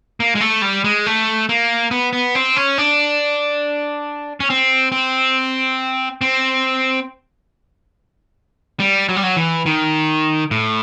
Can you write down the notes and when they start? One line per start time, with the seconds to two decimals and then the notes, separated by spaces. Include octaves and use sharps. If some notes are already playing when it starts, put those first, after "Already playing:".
0.20 A#3
0.35 G#3
0.41 A3
0.62 G3
0.84 G#3
1.06 A3
1.49 A#3
1.91 B3
2.13 B3
2.35 C4
2.56 C#4
2.78 D4
4.40 C#4
4.50 C4
4.92 C4
6.21 C4
8.80 G3
9.09 F#3
9.16 G3
9.23 F#3
9.36 E3
9.66 D#3
10.51 A2